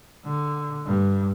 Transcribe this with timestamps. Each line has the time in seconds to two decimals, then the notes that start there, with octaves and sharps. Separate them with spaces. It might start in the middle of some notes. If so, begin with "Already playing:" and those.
0.25 D3
0.86 G2